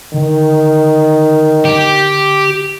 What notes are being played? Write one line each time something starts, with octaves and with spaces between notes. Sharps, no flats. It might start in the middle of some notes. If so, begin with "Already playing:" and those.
D3 D#3
G4